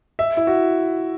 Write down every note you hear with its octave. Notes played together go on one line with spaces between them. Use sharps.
E5
E4
F#4